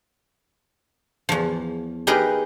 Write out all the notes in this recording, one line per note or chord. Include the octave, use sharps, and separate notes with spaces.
E2 F3
D#4 G4 G#4 A#4 B4 D#5